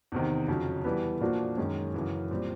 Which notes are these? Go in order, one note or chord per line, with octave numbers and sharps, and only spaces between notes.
E2 C3 D#3
F2 C#3 F#3
E3 G3 B3
A#2 F3 A#3 D4 F#4
F#2 D#3 G#3 C#4
F#2 C#3 E3
A#2 G3 C4